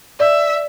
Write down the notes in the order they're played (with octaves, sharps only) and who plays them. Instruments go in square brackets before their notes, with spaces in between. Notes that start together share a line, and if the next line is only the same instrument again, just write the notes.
[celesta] D5 [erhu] E5